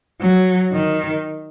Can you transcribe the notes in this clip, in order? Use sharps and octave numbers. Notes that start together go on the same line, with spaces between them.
F#3
D#3